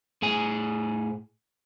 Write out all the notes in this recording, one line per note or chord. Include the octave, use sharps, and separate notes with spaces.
A2 G#4 G#5